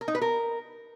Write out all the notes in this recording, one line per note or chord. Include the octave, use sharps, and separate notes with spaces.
A#4
D#4
B4
A#4